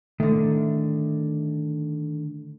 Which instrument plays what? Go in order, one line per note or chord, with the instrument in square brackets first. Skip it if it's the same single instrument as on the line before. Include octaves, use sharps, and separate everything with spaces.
[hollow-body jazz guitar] D3 D#3 [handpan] A3